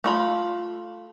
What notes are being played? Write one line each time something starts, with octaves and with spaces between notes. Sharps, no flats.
A3 F4 B5